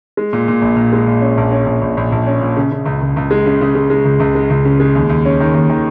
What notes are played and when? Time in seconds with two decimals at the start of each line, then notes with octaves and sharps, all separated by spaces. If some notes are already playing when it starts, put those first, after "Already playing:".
0.17 G#3
0.33 A#2
0.48 A#2
0.62 A#1
0.77 A#2
0.93 G#3
1.07 A#2
1.21 C#4
1.37 A#1
1.52 C#4
1.66 A#1
1.81 A#1
1.97 A#1
2.12 A#1
2.26 C#4
2.41 A#2
2.57 C#3
2.72 C#3
2.86 C#2
3.02 C#2
3.16 C#2
3.31 G#3
3.46 C#3
3.61 C#3
3.75 C#3
3.90 G#3
4.05 C#2
4.20 C#2
4.35 G#3
4.50 C#2
4.65 C#3
4.80 G#3
4.95 D#2
5.10 D#2
5.25 C#4
5.40 D#3
5.54 D#2
5.70 D#3